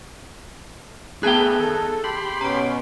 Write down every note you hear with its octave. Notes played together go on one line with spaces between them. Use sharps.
A3 B3 D#4 G#4 B4 G5 A5 F#6
D#3 A4
G4 B5 C6 F#7
B2 B3 C#4 A#5 D7